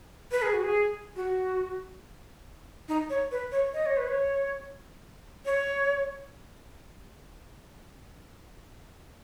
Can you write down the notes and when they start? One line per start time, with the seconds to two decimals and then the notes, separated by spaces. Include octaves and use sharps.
0.32 B4
0.42 G#4
0.53 F#4
0.63 G#4
1.16 F#4
2.88 D#4
3.10 C#5
3.31 B4
3.52 C#5
3.74 D#5
3.86 C#5
3.97 B4
4.08 C#5
5.46 C#5